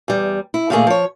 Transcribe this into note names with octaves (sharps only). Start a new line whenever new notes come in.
E2 G3
E4
A#2 D#3 A3 A#3 G#4
F3 C#5